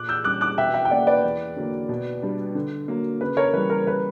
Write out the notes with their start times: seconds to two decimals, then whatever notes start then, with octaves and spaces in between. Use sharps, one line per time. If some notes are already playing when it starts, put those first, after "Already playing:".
Already playing: A#2 D6 F#6
0.09 E6 G6
0.25 G3 C#4 D6 F#6
0.41 D6 F#6
0.58 B2 E5 G5
0.74 E5 G5
0.85 G5
0.90 A#3 C#4 D5 F#5
1.07 B4 D5
1.24 E2
1.56 D3 F#3 A#3
1.89 B2
2.22 G3 B3 D4 G4
2.55 D3
2.88 F#3 A#3
3.21 C#3 B4
3.37 A#4 C#5
3.53 E3 G3 B4
3.70 A#4
3.87 B4